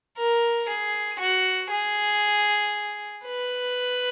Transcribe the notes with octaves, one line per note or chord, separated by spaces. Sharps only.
A#4
G#4
F#4
G#4
B4